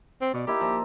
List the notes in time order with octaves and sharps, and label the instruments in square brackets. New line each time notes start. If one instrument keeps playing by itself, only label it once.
[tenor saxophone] C4
[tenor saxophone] B2 [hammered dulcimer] D5
[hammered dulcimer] A#3 D#4 E4 [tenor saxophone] G4
[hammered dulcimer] F3 E5 A#5